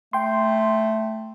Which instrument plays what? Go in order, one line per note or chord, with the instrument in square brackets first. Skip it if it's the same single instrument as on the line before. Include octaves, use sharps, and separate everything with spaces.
[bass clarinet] A3 [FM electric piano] G5 C6